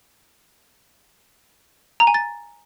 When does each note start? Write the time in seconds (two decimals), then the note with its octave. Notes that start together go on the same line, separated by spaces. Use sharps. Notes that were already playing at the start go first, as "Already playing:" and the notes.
2.00 A#5
2.07 G#5
2.14 A6